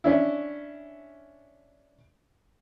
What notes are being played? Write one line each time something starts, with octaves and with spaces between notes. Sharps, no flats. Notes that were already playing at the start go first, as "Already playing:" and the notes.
C#4 D4 E4